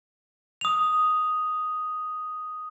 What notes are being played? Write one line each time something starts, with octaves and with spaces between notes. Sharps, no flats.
D#6 F7